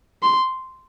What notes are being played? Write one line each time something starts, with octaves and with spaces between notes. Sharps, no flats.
C6